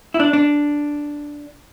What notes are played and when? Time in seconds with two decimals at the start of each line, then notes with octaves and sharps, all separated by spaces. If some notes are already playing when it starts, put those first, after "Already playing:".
0.14 E4
0.20 D4
0.33 D4